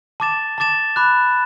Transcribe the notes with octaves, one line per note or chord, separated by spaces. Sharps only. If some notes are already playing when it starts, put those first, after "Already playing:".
A5 D6 A6 E7
A5 D6 A6 E7
B5 D6 F#6